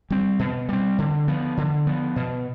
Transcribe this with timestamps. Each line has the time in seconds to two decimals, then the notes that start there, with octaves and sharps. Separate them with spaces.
0.10 G3 C4
0.39 B2
0.69 G3 C4
0.98 D3
1.28 F3 B3
1.57 D3
1.87 F3 B3
2.16 B2